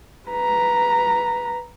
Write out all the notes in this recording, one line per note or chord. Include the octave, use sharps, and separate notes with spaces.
B4 A#5